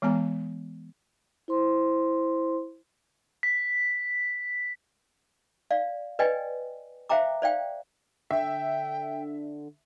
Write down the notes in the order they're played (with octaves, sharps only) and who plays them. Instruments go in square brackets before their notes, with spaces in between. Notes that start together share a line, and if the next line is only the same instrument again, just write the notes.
[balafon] E3 G#3 B3 G#5 A#5
[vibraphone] E4 C5 C6
[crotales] B6
[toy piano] D5 F5
B4 D5 D#5 G5 G#5
C5 E5 F5 G5 A#5 D6
C5 D5 F5 G5
[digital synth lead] D3 [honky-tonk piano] E5 [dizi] G5